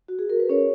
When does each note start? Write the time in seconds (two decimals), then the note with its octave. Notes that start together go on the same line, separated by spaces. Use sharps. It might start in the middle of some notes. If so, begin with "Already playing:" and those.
0.08 F#4
0.19 G#4
0.30 A#4
0.39 B4
0.49 C#4 C#5